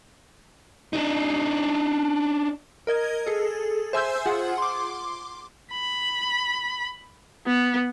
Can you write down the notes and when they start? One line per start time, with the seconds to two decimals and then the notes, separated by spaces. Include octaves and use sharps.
0.93 D4 D#4
2.87 A#4 D#5 G#6
3.27 G#4 A4
3.93 C5 E5 G#5 C6 E6 G6
4.26 F4 G#4 F#5
4.58 C6 D6
5.72 B5
7.46 B3